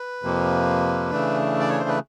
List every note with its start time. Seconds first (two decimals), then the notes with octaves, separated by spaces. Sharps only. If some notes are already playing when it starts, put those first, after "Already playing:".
Already playing: B4
0.23 F2 C3 F3 A#3
1.11 C#3 E3 A3 D4
1.60 D5
1.69 C#5
1.80 C5
1.89 B4